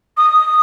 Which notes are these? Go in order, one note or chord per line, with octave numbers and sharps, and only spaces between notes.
D#6